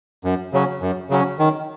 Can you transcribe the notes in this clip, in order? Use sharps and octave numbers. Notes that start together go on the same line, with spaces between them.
F#2
C#3 F#3 C#4
F#2
C#3 F#3 C#4
D#3